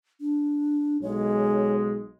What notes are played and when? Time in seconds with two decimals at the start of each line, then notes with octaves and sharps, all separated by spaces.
0.21 D4
1.02 B1 G#3 C#5